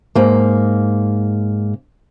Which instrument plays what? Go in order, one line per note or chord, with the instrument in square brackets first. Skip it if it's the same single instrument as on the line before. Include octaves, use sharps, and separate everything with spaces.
[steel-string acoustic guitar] G#2 A#3